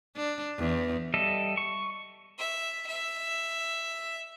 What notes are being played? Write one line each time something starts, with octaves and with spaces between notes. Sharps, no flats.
D4
E2
G3 A4 D#5 E5
C#6
E5
E5